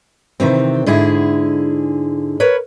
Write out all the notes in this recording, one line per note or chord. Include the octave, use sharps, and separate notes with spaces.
C3 D#3 E3 C4
G#2 D3 E4 G#4
A#4 B4 C#5